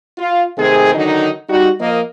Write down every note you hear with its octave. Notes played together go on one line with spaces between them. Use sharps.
F4
C3 D#3 A3 C4 G#4
D3 D#3 F#3 D#4
G3 D#4 F#4
F3 A#3 A#4 D#5